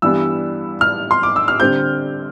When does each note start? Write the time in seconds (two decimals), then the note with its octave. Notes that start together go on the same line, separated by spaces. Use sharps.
0.02 G2 E3 G3 B3 E6
0.81 F6
1.11 C6
1.23 D6
1.36 E6
1.48 F6
1.60 D3 G3 C4 G6